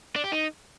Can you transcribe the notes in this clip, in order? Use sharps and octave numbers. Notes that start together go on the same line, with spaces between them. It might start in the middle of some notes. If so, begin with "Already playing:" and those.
D4
G4
D#4